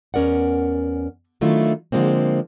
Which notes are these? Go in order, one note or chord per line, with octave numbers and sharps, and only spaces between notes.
E2 C#4 A#4 D5 F#5
D#3 F#3 A3 D4 E4 F4
D3 F3 G#3 A#3 C4